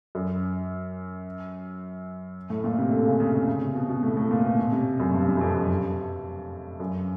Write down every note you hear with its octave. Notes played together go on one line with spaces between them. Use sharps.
F#2
A2
A#2
C3
D3
C#3
C#3
C#3
C#3
C3
B2
B2
A2
A2
A#2
B2
B2
C3
F#2
G2
G2
F#2
F2
F#2
G2
F#2